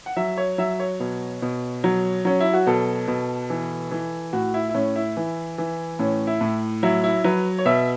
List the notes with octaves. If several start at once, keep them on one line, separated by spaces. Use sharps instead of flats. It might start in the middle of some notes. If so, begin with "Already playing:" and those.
F#5
F#3 E5
C#5
F#3 E5
C#5
B2
B2
F#3
F#3 C#4
E4
F#4
B2 A4
B2
E3
E3
A2 F#4
E4
E4
A2 C#4
E4
E3
E3
A2 C#4
E4
A2
F#3 E4
E4
F#3 B4
C#5
B2 E5